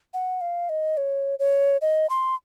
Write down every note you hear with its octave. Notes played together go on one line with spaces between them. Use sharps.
F#5
F5
D#5
C#5
C#5
D#5
C6